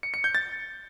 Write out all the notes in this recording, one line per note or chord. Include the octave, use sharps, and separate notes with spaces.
C#7
C#7
G6
A6